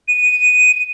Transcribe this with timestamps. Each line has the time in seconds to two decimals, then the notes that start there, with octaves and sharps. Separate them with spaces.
0.08 D#7